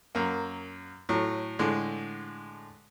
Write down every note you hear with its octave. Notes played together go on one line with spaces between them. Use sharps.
F#2 A#3
A2 F#3
A2 D3 G#3